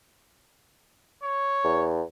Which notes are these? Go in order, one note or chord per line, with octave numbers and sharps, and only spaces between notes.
C#5
E2